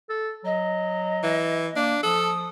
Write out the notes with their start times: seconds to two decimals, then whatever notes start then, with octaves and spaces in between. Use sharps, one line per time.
0.10 A4
0.45 F#3 D#5
1.23 E3
1.76 A#3 D4
2.03 F3 A4 D#6